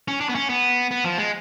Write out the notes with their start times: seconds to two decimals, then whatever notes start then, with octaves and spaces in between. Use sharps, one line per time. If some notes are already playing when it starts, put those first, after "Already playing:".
0.08 C#4
0.21 D4
0.29 B3
0.35 C#4
0.49 B3
0.91 B3
1.05 F3
1.18 G#3